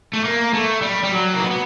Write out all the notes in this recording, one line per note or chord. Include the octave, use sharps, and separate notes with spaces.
A3
A#3
A3
G3
G3
F#3
A#3
B3
B3